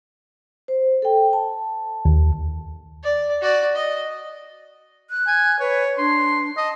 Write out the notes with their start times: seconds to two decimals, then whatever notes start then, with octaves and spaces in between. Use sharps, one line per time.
0.68 C5
1.02 A4 G5
1.33 A5
2.05 D#2
3.03 D5
3.42 F#4 D5
3.75 D#5
5.10 F#6
5.27 G#5
5.60 B4 C#5
5.98 D4 C6
6.57 D#5 A5